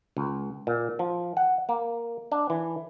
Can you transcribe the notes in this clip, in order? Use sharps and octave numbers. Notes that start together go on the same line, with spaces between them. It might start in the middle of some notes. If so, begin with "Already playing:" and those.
C#2
A#2
F3
F#5
A#3
D4
E3